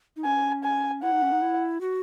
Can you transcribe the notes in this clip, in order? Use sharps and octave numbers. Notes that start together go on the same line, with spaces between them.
D#4
C#4 G#5
G#5
E4 F#5
D#4
C#4
D#4
E4
F#4